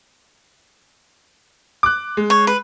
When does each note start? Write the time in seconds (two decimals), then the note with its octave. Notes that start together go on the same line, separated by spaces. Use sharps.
1.83 D6 F#6
2.17 G#3
2.30 C#5
2.47 B4